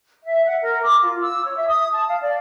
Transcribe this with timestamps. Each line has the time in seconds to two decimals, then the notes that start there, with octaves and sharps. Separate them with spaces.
0.23 E5
0.45 F#5
0.61 A#4
0.84 D6
1.03 F4
1.21 E6
1.45 C#5
1.56 E5
1.68 D#6
1.93 A5
2.09 F5
2.22 D5